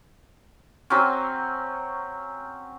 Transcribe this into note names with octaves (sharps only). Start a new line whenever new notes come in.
F#3 C4 C#4